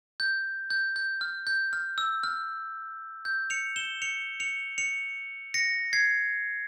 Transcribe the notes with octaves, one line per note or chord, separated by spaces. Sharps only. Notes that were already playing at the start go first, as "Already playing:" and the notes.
G6
G6
G6
F6
G6
F6
E6
F6
G6
C#7 F7
E7 G7
C#7 F7
C#7 F7
C#7 F7
A#6 C#7
G#6 C7